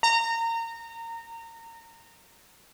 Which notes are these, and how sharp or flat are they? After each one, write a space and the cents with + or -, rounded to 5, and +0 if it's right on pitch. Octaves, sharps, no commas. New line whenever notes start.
A#5 -25